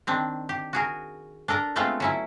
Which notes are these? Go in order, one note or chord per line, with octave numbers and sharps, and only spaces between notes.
D#3 C4 D4
G4
F#4 G#4 A#4
D4 A4 A#4 A#5
G#3 A3 B3 C4 F4 A4
F#3 C#4 E4